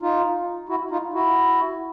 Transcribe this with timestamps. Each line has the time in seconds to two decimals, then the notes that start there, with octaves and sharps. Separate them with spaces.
0.02 D#4 F4
0.69 E4 F#4
0.91 D#4 F4
1.14 E4 F#4